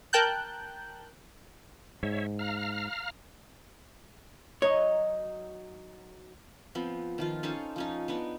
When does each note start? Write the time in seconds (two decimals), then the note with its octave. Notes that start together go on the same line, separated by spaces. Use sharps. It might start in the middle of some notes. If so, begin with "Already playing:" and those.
0.13 A#4 G5 A5 F#6 G6
2.03 G#2 C#5 E5
2.39 F5 A#5 F6
4.62 F#3 D#4 C#5 D#5
6.75 F3 B3 C4
7.18 D#3 F3 F4
7.43 C#4 D#4 A4 C5
7.76 F3 C#4 D#4
8.08 B3 D4 D#4